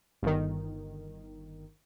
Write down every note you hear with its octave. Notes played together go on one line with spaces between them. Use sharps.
G1 D#3